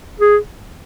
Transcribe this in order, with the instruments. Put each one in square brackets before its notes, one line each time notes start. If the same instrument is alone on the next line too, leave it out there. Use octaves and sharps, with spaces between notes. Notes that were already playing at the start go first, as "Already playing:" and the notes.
[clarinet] G#4